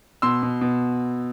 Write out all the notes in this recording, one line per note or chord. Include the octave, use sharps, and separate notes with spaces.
B2 C6 E6
B2
B2